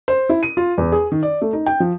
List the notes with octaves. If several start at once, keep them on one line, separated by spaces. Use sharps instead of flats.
C5
E4
D#7
F4
E2
G#4
D#3
D5
A3
D#4
G5
F3